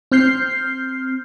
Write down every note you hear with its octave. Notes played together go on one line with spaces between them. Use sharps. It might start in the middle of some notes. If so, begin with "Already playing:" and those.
C4 F6 G6 C7